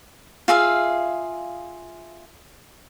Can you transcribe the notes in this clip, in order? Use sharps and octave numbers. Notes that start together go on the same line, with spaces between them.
F4 G#4 E5 F5